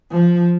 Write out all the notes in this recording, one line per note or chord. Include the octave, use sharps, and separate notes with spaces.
F3